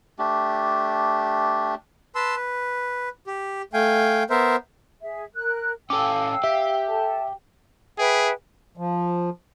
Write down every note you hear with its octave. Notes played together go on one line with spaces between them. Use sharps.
A3 D4 G4
B4 A5 C6 E6
B4
G4
A3 F5 G5 G#5
B3 A#4 C5 E5
G#4 E5
A#4 F#6
C#4 A4 F5 G5 D6 E6
G4 E5
A4 A5
G#4 B4 E5 G5
F3